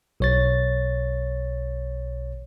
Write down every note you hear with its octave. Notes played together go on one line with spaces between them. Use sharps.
B1 C#5 A6